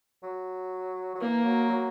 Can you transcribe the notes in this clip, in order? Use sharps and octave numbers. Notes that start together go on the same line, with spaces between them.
F#3
F#3
E3 A#3
F#3
F#3